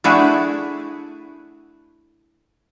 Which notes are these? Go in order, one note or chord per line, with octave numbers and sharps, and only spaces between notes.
A3 D4 E4 F#4 G#4